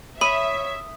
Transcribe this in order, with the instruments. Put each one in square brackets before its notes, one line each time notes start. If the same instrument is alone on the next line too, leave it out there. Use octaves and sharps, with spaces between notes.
[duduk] C#5 [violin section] E5 [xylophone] B5 [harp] D#6